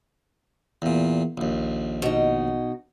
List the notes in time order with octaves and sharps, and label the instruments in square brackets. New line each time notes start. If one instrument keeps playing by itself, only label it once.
[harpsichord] E2 A#2
A#1 D#2
[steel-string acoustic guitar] B2 D#4